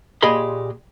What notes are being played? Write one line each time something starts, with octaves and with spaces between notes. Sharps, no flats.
A#2 G4 G#4 D#5 B5 C6